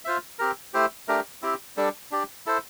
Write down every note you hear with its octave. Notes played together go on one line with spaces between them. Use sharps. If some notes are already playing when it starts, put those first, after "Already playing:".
F4 C5 E5
C4 G4 A#4
A3 E4 G4 C5
A3 D4 G4 A#4
C4 E4 G4
G3 D4 A4
D4 G4 D5
E4 A4 C5